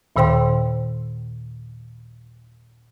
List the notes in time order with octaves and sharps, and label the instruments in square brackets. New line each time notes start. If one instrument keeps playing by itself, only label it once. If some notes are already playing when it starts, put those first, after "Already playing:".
[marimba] D#2 A#2 D#3 C5 G5 C6